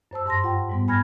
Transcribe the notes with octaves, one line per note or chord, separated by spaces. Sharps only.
F#2 C5 A5 E6
G2 A5 C6 A#6
F4 F#5 G5
G#2 G3 B3
G#5 B5 F6 G#6 A#6